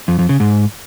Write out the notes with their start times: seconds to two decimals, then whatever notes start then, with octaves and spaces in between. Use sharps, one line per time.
0.08 F2
0.19 F2
0.29 C#3
0.40 G#2